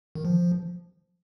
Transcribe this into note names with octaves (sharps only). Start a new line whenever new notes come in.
D#3
F3